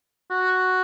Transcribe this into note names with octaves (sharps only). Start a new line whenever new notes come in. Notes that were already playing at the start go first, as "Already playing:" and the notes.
F#4